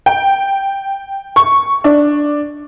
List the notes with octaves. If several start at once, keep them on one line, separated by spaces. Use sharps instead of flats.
G5
C#6
D4